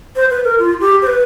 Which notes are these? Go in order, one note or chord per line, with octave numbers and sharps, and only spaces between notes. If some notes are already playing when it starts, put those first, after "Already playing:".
C5
B4
A#4
F4
G4
C5
B4